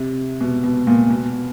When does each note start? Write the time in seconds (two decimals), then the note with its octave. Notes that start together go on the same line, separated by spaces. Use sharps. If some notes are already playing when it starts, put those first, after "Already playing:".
Already playing: C3
0.41 B2
0.64 B2
0.87 A#2
1.10 B2